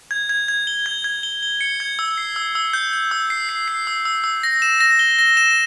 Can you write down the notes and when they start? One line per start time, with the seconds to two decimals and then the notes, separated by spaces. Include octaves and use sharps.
0.11 G#6
0.29 G#6
0.48 G#6
0.67 G7
0.86 G#6
1.04 G#6
1.23 G7
1.43 G7
1.61 C#7
1.80 G#6
1.99 E6
2.18 C7
2.36 E6
2.55 E6
2.73 G6
2.93 G6
3.11 E6
3.30 C7
3.49 C7
3.68 C7
3.87 E6
4.05 E6
4.24 E6
4.43 A#6
4.62 E7
4.80 A#6
4.99 G7
5.19 A#6
5.37 E7